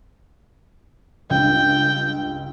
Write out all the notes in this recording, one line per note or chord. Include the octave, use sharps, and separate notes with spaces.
C#2 G2 G5